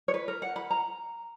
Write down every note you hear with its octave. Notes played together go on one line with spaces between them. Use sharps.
C#5
B4
A#4
F#5
B5
A#5